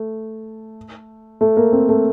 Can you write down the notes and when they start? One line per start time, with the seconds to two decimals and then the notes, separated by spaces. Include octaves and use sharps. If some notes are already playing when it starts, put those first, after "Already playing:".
Already playing: A3
1.41 A3
1.57 A#3
1.72 C4
1.89 A3